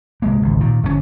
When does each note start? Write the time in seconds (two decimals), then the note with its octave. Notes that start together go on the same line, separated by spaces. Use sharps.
0.22 C2 G#3 A#3
0.42 G#1 C#2
0.60 A#2 D#3
0.83 G1 D2 B2 C#4